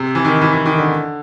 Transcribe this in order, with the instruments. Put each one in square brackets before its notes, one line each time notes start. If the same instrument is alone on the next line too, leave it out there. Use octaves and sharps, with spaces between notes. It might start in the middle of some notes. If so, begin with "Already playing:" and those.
Already playing: [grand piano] C3
E3
D#3
E3
E3
D#3
D3